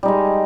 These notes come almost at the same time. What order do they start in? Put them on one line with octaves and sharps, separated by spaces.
G3 D#4 G#3